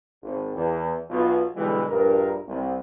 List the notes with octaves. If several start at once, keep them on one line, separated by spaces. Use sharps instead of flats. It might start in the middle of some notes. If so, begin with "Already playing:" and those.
G#1
E2
B1 B2 F4
B1 B2 D3 E3 G3 G#3
A#1 G2 A#4
C2